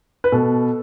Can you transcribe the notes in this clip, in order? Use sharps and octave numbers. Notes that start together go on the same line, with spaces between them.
B4
B2 A4